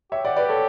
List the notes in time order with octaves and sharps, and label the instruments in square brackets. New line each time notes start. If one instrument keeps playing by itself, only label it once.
[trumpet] G4 [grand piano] C#5 E5
[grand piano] D5 F#5
B4 D5
A4 C#5